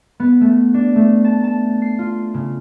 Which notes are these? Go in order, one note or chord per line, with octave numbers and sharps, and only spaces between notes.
B3
A3
D4
A3
A5
A5
C7
F4
C#3